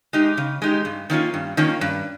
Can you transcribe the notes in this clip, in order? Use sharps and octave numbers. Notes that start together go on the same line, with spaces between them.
G#3 D#4 G4
C#3
G#3 D#4 G4
G2
D#3 A#3 C#4 F4
G2
D#3 A#3 C#4 F4
G2